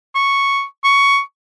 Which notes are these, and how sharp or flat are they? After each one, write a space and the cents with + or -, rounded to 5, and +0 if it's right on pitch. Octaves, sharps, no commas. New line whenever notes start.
C#6 +0
C#6 +10